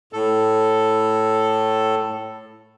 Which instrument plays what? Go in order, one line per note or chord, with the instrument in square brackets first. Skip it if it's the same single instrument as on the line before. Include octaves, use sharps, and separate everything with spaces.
[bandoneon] A2 A4